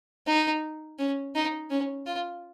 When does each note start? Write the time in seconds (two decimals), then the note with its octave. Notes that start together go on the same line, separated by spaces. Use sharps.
0.27 D#4
0.99 C#4
1.35 D#4
1.70 C#4
2.06 F4